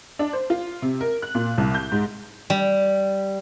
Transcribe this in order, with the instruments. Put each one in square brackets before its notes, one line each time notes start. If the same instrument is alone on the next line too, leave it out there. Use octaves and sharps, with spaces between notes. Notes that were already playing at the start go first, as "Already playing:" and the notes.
[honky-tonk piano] D4
C5
F4
C3
A#4
F#6
A#2
C2
G6
G#2
[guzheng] G3